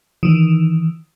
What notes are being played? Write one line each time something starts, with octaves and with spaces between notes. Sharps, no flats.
D#3 E3